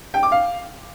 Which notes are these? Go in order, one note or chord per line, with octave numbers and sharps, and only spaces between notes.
G5
D6
F5